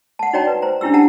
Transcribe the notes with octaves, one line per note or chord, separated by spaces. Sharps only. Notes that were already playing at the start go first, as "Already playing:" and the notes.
F#5 A5
D#4 F#4 C#5 D5 G5 A#5
B4
C5 A#5
C#4 D4 E4 G4 E6
G4 F#5 A5 A#5